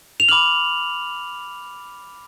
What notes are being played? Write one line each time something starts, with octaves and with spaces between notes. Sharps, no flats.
F7
B5 D6 F6 F#7